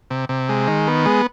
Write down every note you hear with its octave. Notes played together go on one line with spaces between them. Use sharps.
C3
C3
G#3
D#3
B3
G#3